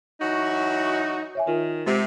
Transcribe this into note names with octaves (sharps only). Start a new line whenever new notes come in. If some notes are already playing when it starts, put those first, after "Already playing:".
E3 F#3 D#4 F#4
C#5 E5 G#5
D#3 F4 A#4
C3 G#3